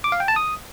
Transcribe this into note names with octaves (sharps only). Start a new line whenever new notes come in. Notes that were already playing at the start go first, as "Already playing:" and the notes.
D6
F5
G5
A5
D#6